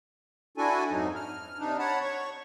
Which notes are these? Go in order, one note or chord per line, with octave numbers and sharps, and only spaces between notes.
D4 E4 F#4 A4 G#5
F2 G#2 F#3 D#4
F6
C3 D4 D#4
C#5 F#5 A5 B5
C#5 C#6